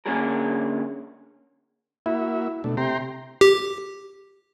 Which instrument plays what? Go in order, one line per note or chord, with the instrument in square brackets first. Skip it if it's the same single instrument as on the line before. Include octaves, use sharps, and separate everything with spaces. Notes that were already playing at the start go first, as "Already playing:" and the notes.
[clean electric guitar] D3 A#3 C#4 D4 G#4 A#4
[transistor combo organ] A#3 F#4 E5 [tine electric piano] E4
[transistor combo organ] B2 A3 D4
[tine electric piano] C3 [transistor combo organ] G5 A#5 C6
[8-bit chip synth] G4